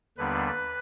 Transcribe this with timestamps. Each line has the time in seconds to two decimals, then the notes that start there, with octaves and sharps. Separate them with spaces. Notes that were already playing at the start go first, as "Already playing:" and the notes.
0.17 D#2 D3 G3 B3 D4 B4